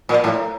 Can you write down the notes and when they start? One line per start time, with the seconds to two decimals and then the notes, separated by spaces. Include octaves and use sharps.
0.09 A#2
0.24 A2